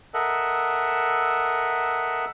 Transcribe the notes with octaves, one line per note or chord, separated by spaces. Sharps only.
A4 A#4 D#5 E5 F#5